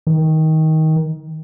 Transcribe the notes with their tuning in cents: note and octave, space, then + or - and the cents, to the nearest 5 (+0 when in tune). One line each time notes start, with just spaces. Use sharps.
D#3 +20